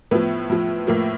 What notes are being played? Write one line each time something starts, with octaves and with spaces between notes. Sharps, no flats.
A2 F3 B3
A2 F3
A2 F3 A#3